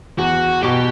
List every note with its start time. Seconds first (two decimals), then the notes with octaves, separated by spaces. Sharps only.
0.18 E2 F#4
0.63 B2 G4